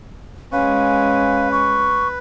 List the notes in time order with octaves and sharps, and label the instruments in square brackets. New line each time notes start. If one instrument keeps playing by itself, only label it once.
[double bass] G#3 C#4 [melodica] B4 [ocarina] F5
[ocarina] C#6